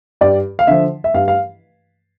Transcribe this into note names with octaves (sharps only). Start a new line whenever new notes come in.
G2 D5
F5
D3 F3 E5
E5
G2 F5
F5